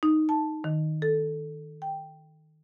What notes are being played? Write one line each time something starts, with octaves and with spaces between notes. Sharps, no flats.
D#4
A5
D#3
A4
G5